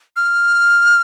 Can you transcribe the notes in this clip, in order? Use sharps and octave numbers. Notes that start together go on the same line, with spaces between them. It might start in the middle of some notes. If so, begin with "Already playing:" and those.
F6